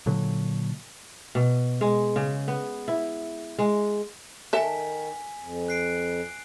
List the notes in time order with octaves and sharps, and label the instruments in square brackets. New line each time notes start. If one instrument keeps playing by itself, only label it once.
[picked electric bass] A#2 D3 F#3
[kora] B2
G#3
C#3
B3
E4
G#3
[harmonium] D#3 [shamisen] A4 E5 [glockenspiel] G#5 B6
[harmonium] F2
[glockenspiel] F#6 C7 D7